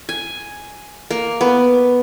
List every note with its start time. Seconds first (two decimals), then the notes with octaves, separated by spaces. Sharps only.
0.09 G#5
1.11 A#3
1.41 B3